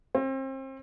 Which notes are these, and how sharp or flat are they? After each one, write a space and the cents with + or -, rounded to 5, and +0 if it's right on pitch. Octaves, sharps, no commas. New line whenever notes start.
C4 +35